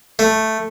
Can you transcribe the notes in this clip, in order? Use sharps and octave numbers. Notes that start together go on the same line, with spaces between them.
A3